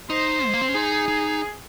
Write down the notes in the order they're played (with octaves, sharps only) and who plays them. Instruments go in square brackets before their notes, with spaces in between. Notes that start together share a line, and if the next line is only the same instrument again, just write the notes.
[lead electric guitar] D#4 [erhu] C5
[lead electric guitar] G#3
A#3
C4
C#4
[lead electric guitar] D#4 [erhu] G#4
[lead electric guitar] D#4